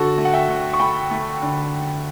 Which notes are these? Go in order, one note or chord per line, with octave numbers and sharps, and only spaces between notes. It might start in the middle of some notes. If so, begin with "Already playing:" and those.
Already playing: D3 F#4 A4
A3
F#5
E5 G5
D2
C#6
A3 G5 B5
A3
D3